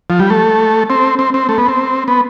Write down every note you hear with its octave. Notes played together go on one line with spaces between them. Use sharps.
F3
G3
A3
C4
C4
C4
A3
B3
C4
B3